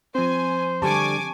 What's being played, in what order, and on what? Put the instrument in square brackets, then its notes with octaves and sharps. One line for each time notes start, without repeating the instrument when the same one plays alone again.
[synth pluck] F3 C4 [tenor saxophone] C5 [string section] G#5
[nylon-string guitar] D3 G3 [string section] G#5 D6 [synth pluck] A5 C#6